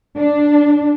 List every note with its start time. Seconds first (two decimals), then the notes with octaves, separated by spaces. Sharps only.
0.18 D4